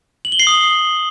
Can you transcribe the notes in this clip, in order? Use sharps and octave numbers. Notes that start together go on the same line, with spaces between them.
F#7
G7
C7
D#6